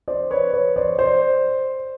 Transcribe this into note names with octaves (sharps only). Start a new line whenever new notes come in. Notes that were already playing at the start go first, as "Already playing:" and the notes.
C5 D5
B4 C#5
B4 C#5
C5 D5
C5 D5